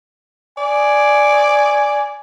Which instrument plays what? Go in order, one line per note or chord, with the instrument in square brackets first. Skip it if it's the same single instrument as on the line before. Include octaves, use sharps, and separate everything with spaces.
[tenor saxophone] D5 [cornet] G#5